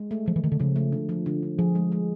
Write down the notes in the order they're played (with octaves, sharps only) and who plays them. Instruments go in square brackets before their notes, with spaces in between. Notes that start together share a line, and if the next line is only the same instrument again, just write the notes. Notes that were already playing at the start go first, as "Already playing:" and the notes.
Already playing: [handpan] G#3
A3
[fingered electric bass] F3 [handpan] A3
[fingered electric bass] E3
[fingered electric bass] D#3 [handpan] A3
[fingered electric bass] D3
[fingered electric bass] C#3 [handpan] F3
[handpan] A3
D3
F3
D3
D3
[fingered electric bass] F3 [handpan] G#4
[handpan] G#3
G#3